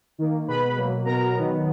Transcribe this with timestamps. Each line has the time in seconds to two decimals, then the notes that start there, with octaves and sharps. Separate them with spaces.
0.18 D#3 A#3
0.48 B2 G#3 B3 B4 B5
0.76 B2 F#3 A#3
1.05 B2 F#3 B3 A#4 A#5
1.35 D#3 F#3 B3